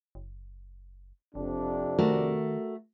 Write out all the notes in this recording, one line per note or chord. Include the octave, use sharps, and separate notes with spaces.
F#1
F#1 F2 C3 D4
D#3 A3 F#4 A#4